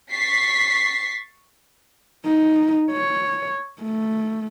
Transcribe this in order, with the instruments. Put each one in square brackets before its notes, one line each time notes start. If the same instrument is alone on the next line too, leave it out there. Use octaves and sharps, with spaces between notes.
[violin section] C#6 A6 B6 C7
[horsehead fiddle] D#4
C#5
A3